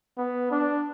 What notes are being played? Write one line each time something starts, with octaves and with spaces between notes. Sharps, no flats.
B3
D4